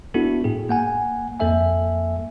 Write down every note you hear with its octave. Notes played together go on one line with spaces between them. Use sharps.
B3 D4 E4 F#4 A4
A2 G#4
A#3 F#5 G#5
F2 A#3 A4 E5 G#5